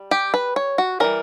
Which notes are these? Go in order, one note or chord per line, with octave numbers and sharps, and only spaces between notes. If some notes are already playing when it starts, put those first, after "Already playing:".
Already playing: G3
G4
B4
C#5
F#4
E3 G3 C#4 A#4